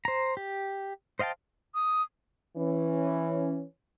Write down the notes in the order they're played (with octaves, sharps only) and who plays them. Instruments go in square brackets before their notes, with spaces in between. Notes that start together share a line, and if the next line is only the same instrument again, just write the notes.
[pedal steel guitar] C5 A#5
G4
C5 D#5 F5 G5 A5
[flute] D#6
[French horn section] E3 C#4